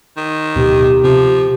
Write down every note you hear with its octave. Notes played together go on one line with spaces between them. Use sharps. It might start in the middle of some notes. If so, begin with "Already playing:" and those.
D#3
D1 B2 G4
C3 F3